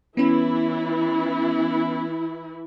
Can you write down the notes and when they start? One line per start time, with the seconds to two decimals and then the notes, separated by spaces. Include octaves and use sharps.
0.17 E3 B3 C#4 E4